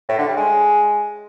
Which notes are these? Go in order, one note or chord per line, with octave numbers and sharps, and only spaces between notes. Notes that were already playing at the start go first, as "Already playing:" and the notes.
A2
D3
G3
G#3